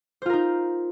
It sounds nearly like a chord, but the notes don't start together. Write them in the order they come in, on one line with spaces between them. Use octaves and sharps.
C5 F4 A#4 D#4